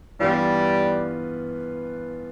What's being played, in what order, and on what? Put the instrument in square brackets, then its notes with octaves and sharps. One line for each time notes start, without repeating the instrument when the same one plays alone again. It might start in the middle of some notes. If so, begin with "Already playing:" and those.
[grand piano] G2 E3 B3 F4 B4 [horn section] G3